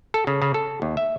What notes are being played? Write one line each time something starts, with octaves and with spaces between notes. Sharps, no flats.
A4
C#3
C#3
A4
D#2
E5